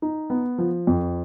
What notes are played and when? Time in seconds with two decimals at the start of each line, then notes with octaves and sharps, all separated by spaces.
0.02 D#4
0.30 B3
0.58 F3
0.87 F2